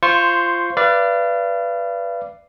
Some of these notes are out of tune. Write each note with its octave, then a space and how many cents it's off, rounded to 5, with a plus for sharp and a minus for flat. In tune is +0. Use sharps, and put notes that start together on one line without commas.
F4 -15 C5 +0 C#6 -10
B4 +0 D5 +0 F5 -35